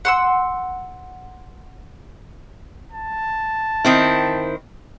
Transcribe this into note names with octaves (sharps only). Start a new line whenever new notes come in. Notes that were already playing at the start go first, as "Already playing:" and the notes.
F#5 C6 E6
A5
D#3 C4 E4